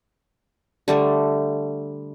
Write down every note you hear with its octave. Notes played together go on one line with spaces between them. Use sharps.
D3 G3 A3